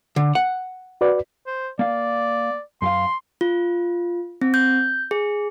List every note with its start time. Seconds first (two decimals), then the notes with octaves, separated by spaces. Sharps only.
0.16 D3
0.35 F#5
1.01 F#4 B4 D5
1.47 C5
1.79 A#3 D5 F5
2.82 F#2 F#4 F5 C6
3.41 F4
4.41 C4
4.54 G6
5.11 G#4